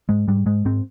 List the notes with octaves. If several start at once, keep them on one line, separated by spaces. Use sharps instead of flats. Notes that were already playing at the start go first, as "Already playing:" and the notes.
G#2 G#3
G#2 G3
G#2 G#3
G#2 C4